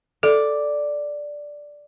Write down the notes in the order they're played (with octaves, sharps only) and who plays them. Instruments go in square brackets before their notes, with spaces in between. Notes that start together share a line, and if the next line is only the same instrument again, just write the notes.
[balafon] A4 [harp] D5